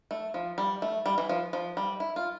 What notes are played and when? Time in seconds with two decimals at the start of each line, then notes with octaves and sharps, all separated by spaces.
0.11 A3
0.34 F3
0.58 G3
0.82 A3
1.06 G3
1.18 E3
1.29 F3
1.53 F3
1.77 G3
2.00 E4
2.16 F4